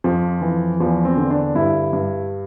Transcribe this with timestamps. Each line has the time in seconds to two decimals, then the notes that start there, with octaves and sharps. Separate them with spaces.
0.04 F2 F3
0.41 E3
0.80 E2 F3
1.05 C4
1.17 D3
1.30 D4
1.55 G2 E4
1.93 G2